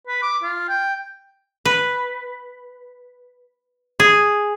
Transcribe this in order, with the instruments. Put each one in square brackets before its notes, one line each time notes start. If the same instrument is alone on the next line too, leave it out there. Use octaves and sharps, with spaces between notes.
[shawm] B4
D6
F4
G5
[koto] B4
G#4